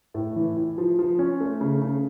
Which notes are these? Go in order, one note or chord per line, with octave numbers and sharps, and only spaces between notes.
A2
E3
E4
F3
F3
C#4
A3
C#3
C#3